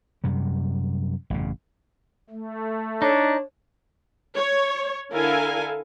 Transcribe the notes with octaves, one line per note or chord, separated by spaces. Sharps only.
F#2 C3 G3
A1 F#2 C#3
A3
D4 D#4 C#5
C#5
D3 E4 A4 A#4 F5 G#5